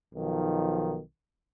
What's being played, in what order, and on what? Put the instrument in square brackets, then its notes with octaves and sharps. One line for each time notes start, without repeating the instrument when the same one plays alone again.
[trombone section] B1 D#3 F3